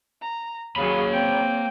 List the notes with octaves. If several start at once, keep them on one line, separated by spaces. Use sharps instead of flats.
A#5
D#2 C#3 F#3 A#3 G#4 C#5 F5 B5
C4 G5